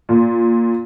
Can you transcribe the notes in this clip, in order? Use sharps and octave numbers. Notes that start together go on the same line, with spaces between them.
A#2